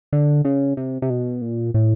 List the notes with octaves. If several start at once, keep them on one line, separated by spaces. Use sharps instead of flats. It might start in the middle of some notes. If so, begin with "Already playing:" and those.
D3
C#3
C3
C3
B2
A#2
A2